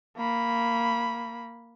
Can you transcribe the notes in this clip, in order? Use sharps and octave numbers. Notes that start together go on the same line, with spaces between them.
A#3 B5